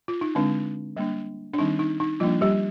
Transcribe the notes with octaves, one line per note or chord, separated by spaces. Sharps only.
F4
D#4
D3 G#3 C4 D4
G3 A#3 D4
D4
D#3 G3 C4 D#4
D#4
D#4
F3 G3 A#3 D4 F4
G3 G4